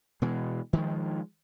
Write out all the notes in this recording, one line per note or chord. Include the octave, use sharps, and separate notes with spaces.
B2 E3 G#3
D#3 F3 G#3